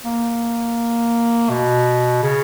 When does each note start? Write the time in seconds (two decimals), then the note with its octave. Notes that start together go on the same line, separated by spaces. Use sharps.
0.05 A#3
1.50 B2
2.23 C#3